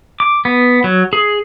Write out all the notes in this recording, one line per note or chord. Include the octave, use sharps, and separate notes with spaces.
D6
B3
F#3
G#4